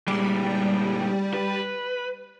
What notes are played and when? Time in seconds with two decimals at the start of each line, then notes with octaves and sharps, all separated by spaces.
0.08 A#2 G3 G#3
1.34 B4